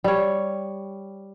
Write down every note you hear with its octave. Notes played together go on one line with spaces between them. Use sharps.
G3 C#5